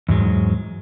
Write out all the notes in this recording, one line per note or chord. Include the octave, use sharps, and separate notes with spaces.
E2 G#2 F#3 G#3